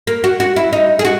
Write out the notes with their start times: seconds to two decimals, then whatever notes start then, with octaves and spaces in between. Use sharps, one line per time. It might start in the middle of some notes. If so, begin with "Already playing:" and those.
0.07 A#3
0.24 F#4
0.40 F#4
0.56 E4
0.73 D#4
0.99 G#4
1.05 F#4